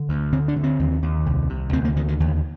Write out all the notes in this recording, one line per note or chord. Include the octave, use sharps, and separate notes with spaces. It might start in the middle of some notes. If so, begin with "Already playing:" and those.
Already playing: D3
D2
D3 C4
D4
D3
C4
D#2
D#2
C2
C3
D2 C4
A#3
D3 D#3
D#3
D#2